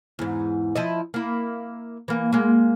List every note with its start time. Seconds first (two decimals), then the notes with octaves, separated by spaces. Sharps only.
0.19 E2 G#2
0.75 F3 E4 D#5
1.14 A#3 E4
2.08 E3 A#3
2.33 G#3 A#3